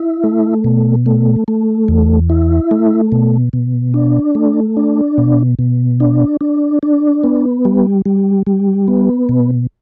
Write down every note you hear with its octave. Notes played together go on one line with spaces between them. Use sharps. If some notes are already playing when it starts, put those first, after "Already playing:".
Already playing: E4
A3
B2
A3
A3
E2
E4
A3
B2
B2
D4
A3
D4
B2
B2
D4
D4
D4
B3
G3
G3
G3
B3
B2